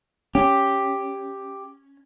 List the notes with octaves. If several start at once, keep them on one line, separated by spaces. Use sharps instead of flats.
C#4 G4